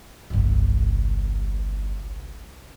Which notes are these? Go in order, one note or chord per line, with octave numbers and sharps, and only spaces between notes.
G1 C2